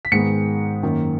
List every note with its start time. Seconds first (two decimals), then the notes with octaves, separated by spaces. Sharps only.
0.05 B6
0.12 G#2 D#3 G#3 B3 C#7
0.83 F#2 D#3 A#3